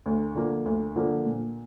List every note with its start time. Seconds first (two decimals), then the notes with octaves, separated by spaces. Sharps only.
0.06 D2
0.35 D3 F3 A#3
0.66 D2
0.96 D3 F3 A#3
1.26 A#2